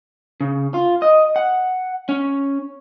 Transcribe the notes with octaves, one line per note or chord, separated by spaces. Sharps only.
C#3
F4
D#5
F#5
C#4